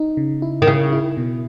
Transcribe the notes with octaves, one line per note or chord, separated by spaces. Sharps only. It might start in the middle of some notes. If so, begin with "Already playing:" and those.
Already playing: D#4
C#3
E4
D#3
C#3 E4
E4
B2